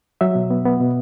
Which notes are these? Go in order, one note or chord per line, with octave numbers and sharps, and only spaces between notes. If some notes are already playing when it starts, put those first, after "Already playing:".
F#3 E5
B2
B3
B3
B2